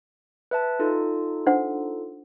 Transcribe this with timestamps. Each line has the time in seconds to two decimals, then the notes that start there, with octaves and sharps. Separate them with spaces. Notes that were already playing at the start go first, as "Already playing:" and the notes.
0.51 B4 E5 A5
0.79 D#4 F4 A4
1.46 D4 C5 F#5